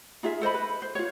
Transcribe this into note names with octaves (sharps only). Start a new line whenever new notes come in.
D#4 F4 G#4 E5
A4 C5 D#5 B5
B4
C5
F4 C#5